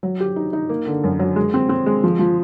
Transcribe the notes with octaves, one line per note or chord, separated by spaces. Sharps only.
F#3
G4
D#4
D#4
A#3
D3
F#2
F#3
G#3
C4
C4
G#3
F3
F3